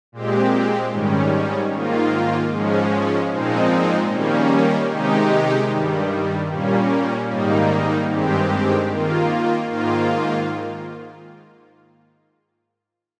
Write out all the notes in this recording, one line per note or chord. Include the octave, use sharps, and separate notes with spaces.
A#2 G#3 C4 G4
G#2 D#3 G3 C#4
G#2 D#3 A#3 F4
G#2 F3 G#3 C#4
A#2 F3 G#3 C4 D#4
D#3 G3 A#3 C#4
C3 D#3 G#3 D#4 G4
G2 D#3 G3
A#2 G3 A#3 C#4
G#2 D#3 G3 A#3 D#4
G2 D#3 G#3 C4 G4
D#3 A#3 F4
G#2 D#3 A#3 F4